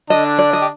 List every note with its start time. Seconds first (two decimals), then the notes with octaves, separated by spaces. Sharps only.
0.10 D3 D4 D#5
0.39 D5
0.53 D#5
0.61 G4